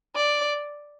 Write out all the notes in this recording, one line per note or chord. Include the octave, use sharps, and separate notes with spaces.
D5